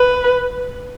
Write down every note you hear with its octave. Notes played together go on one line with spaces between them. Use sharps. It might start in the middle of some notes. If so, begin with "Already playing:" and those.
Already playing: B4